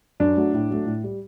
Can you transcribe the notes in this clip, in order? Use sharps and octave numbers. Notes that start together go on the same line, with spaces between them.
F#2 D4
F#3 A3
A2
F#3 A3
A2
G3